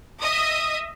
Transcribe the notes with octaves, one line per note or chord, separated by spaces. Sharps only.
D#5 E5 D#6